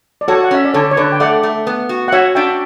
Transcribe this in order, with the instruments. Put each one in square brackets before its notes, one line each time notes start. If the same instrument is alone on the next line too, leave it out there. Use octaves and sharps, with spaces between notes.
[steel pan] D5
[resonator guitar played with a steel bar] F#4 [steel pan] A4 C#5
[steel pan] F#5
[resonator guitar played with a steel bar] C#4 [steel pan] E5
[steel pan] D5
[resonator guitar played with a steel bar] D3 [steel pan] A4 C#5
[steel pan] C#5
[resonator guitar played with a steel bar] D3 [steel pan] B4 D5
[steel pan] G5
[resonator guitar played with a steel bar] A3 [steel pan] D5 F#5
[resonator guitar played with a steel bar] A3
B3
F#4
[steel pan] F#5
[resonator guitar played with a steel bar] F#4 [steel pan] C#5 E5
[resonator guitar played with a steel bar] D4 [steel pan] E5 G5